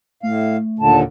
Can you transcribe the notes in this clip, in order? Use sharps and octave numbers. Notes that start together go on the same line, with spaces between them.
A2 A3 F5
D#2 A#2 D3 A5